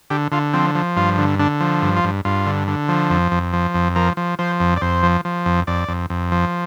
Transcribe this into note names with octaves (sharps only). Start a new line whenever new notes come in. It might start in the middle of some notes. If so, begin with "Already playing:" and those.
D3 G4
D3 F4
F3 C4
F3
G2 F4
D3
D3 D4
F3
G2
F4
G2
G2 F4
D3
D3
F3
F2
F2
F3
F2
F3 A#4
F3
F3 C5
F2
D5
F2 C5
F3
F3
F2
F2 D5
F2
F2
F3